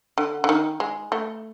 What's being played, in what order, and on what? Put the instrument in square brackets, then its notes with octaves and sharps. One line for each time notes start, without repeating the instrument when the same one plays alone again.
[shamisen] D3
D3
D#3
G#3
A3